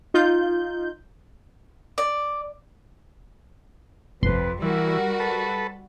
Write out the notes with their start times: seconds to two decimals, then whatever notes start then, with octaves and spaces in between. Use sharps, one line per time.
0.14 D#4 F4 G6
1.98 D5
4.23 G1 C2 F2 B4 C6
4.62 E3 G3 F#4 A#4
5.20 A4 B4